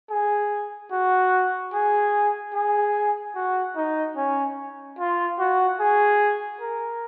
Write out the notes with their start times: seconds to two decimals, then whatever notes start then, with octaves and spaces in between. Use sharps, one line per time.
0.10 G#4
0.91 F#4
1.73 G#4
2.54 G#4
3.35 F#4
3.76 D#4
4.16 C#4
4.99 F4
5.39 F#4
5.80 G#4
6.61 A#4